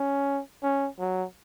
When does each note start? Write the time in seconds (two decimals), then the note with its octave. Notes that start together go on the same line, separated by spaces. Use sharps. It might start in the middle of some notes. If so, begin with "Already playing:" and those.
Already playing: C#4
0.63 C#4
0.99 F#3